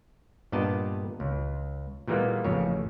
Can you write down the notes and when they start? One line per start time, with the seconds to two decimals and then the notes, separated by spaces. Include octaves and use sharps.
0.52 G2 A#2 B3 D5 D#5 A5
1.20 C#2
2.08 A#2 E3 G3 G#3 A#3 B3
2.44 A1 F2 C#3 C#5